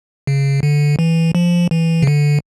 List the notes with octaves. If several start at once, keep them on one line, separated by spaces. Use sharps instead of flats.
C#3
D3
E3
F3
E3
C#3
D3